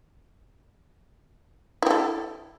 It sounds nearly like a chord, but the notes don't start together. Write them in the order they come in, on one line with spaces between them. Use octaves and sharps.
E4 G4 A4